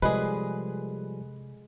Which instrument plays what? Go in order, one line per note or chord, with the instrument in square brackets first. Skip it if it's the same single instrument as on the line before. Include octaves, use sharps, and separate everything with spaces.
[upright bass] C3 [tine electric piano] F3 G3 A4 [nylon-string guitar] G#3 G#4 [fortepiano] B4